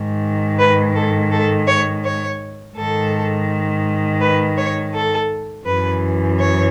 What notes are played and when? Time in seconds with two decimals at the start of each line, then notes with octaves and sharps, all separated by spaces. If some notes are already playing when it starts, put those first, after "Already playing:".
Already playing: G#2 D#3
0.58 B4
0.94 A4
1.31 A4
1.67 C#5
2.03 C#5
2.75 G#2 D#3 A4
4.20 B4
4.56 C#5
4.93 A4
5.65 F#2 E3 B4
6.38 C#5